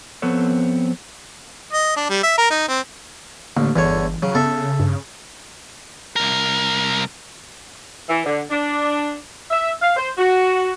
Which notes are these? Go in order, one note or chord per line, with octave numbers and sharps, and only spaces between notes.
F3 B3 C4 A4 C#5
D#5
D4
G3
E5
A#4
D#4
C4
A1 D3 A#3
G1 E2 D3 E3 C#5
C#3 F#3
C#3 B3 A4 E5
G2
C2 A#4
E3
D3
D4
E5
F5
C5
F#4